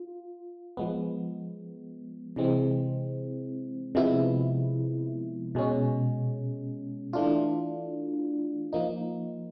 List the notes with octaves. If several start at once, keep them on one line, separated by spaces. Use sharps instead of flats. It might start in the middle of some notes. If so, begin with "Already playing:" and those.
Already playing: F4
F3 G#3 B3
C3 E3 G#3 C4
C3 F3 G#3 B3 E4
B2 G#3 C#4
E3 A3 D4 F4
F3 A#3 D#4